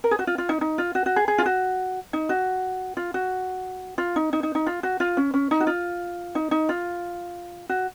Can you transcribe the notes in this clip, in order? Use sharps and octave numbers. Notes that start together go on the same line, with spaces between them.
A#4
G#4
F#4
F4
F4
D#4
D#4
F4
F#4
F#4
G#4
G#4
F4
F#4
D#4
F#4
F4
F#4
F4
D#4
D#4
D#4
D#4
F4
F#4
F4
C#4
C#4
D#4
F#4
F4
D#4
D#4
F4
F#4